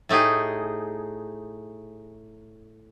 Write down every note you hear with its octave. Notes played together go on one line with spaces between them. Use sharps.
A2 A3 D#4 G4 G#4